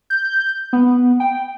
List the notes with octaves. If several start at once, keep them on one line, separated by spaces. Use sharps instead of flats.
G6
B3
G5